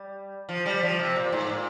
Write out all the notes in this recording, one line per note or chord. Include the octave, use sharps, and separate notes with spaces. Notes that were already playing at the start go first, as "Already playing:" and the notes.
Already playing: G3
F3
G3
F3
C3
A#2
G#2
A#2